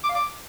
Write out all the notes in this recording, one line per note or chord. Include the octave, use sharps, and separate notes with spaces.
D6
F5
D6